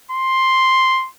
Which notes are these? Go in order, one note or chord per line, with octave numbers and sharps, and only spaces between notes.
C6